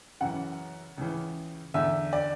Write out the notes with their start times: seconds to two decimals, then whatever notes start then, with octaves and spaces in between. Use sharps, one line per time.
0.21 F#2 C#3 E3 F#5
0.98 C#2 C#3 E3
1.74 E2 D3 E5
2.13 D5